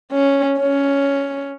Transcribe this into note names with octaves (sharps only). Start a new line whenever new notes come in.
C#4
C#4